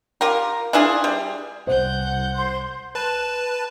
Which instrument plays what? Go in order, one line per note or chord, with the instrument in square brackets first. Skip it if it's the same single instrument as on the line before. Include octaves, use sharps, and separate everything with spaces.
[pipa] F4 G4 A#4
D4 E4 F4 G#4
G3
[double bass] C2 [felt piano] C5 [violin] F#5 G6
[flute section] C5 C6
[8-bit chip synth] B4 A5